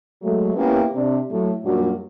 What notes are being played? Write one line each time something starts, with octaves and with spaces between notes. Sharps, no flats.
F#3 G#3 A3
A#3 B3 C#4 E4 G4
C3 D4
A2 F#3 A3
F#2 A#2 G3 A#3 D4 F#4